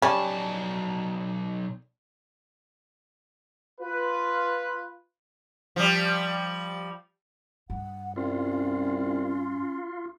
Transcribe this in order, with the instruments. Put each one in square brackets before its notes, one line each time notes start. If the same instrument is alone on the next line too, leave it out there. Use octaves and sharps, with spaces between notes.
[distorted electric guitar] B1 A5 [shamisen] G3 C#4
[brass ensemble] F4 B4
[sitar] F3 G3
[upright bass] G2 [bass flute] F#5
[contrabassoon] C2 [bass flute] C#4 [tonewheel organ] F4